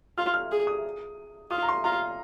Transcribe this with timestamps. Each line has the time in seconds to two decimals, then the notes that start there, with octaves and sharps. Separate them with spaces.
0.18 F4 F6
0.34 F6
0.52 G#4
0.67 D#6
1.51 F4 D#6
1.62 A#5
1.69 C6
1.84 F4 A#5